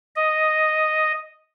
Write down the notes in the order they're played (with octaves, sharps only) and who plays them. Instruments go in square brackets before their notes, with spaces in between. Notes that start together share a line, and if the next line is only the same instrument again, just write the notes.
[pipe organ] D#5